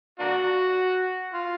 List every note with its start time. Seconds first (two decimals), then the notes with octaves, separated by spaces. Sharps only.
0.20 A#3 D4 F#4
1.34 F4